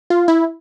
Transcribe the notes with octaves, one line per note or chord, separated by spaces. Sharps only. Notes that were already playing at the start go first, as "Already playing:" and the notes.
F4
E4